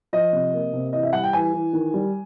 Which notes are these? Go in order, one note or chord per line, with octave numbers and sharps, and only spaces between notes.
F3 D#5
C3
A#3
C3
E3 D#5
E5
G3 F#5
G5
E3 G#5
E3
D#3
G3